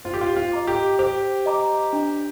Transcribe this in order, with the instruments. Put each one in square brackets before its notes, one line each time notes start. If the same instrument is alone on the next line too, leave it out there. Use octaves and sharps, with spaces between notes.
[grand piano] F4 [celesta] C5
[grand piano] G4
F4
F4
[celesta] D#5 A#5 D6
[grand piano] G4
[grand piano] G4 [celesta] C5
[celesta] D#5 A#5 D6
D4